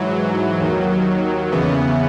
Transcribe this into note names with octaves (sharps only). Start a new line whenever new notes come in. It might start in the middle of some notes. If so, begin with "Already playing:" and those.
Already playing: G#2 E3 F#3
D#2 D#3
E2 C#3 E3 B3